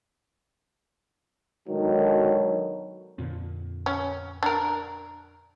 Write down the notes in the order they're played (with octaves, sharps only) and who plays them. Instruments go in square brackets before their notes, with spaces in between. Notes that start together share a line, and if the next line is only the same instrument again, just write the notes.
[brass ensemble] G#2 B2 D3 D#3 F#3
[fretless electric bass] F2 A#2 D3
[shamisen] C#4
D4 A#4